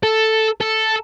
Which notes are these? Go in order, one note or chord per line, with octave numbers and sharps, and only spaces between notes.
A4
A4